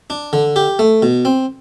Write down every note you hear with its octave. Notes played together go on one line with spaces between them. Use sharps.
D4
D3
G4
A3
B2
C4